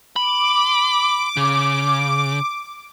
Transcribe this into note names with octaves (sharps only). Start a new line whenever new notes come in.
B5 D6
C#3